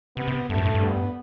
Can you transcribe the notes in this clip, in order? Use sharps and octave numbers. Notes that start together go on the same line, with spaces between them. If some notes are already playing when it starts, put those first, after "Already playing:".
C3 B3
C3
G2 A3
F#2
A2
G2
B3